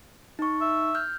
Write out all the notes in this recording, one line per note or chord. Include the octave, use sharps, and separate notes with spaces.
D#4 C#6
E5
F6 G6